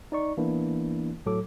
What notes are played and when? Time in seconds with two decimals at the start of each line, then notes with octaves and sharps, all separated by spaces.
0.12 D#4 D5 C#6
0.37 E3 A#3 B3 D4 E4
1.26 A2 F#3 A4 D6